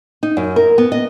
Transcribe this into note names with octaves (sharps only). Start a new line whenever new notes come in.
D#4
F#2
A#4
B3
D#5